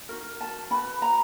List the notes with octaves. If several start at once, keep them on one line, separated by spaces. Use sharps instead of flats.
D#4 F#4 A#4
A5
C#4 F#4 B4 B5
A#5